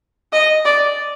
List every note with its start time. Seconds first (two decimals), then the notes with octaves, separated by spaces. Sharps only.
0.33 D#5
0.65 D5